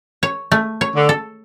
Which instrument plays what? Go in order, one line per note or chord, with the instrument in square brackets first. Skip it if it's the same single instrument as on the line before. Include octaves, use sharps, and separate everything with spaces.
[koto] C#5
A3
C#5
[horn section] D3
[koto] A4